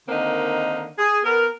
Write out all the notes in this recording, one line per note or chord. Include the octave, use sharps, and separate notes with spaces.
D3 D#3 A#3 C4 D#4
G#4
B3 A#4